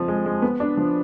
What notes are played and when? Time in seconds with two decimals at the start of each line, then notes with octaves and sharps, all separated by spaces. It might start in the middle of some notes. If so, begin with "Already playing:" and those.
Already playing: F2 F3
0.08 G#3
0.26 G#3
0.42 B3
0.60 D4
0.77 F3